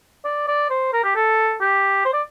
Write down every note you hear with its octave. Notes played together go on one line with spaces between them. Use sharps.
D5
D5
C5
A#4
G4
A4
G4
C5
D5